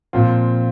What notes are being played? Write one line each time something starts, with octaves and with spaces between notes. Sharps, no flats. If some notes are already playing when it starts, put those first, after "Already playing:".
A#2 F3 C4 F4